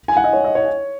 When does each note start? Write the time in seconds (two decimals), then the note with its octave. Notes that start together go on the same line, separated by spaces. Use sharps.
0.08 G#5
0.17 F#5
0.24 D#5
0.33 C#5
0.45 D#5
0.55 C#5